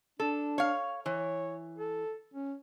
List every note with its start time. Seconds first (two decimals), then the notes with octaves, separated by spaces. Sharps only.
0.20 D4 A4
0.58 C#5 F5
1.06 E3 C#5
1.78 A4
2.34 C#4